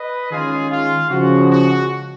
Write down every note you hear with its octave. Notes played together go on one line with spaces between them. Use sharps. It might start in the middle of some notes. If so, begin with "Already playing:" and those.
Already playing: B4 D#5
D#3 G#3 C#4 F4 G#4
F4
C#3 F3 G#3 F#4
F#4